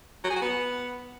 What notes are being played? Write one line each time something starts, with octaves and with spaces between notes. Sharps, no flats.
F#3
G#4
F#4
B3